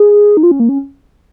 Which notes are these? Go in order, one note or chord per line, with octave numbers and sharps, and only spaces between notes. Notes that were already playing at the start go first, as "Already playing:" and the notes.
Already playing: G#4
D#4
F4
C#4
A#3
C#4